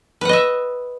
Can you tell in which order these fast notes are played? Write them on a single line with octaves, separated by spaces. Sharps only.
B4 F#5 D#5 E5